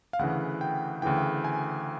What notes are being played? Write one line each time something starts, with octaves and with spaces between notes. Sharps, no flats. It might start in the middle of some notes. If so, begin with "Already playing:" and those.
F5
D2 C#3 E3 F#5
G5
D2 C#3 E3 G5
G#5